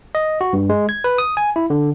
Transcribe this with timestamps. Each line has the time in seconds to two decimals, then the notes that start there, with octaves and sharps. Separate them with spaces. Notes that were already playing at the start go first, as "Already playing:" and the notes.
0.15 D#5
0.41 F#4
0.53 G2
0.69 G#3
0.89 G#6
1.04 B4
1.18 D#6
1.37 G#5
1.56 E4
1.70 D3